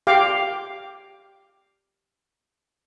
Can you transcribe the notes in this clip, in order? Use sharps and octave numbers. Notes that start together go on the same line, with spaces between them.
G4 F5 G5 D6